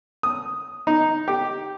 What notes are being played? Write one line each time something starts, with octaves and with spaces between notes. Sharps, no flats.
D#6
D#4
G4